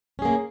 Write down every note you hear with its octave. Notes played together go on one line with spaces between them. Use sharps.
A#3 C#4 G#4